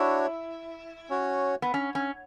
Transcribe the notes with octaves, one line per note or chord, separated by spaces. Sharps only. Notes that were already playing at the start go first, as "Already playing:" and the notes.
Already playing: D4 E4 F#4 C#5
C#4 F#4 C#5
B3
C#4
C#4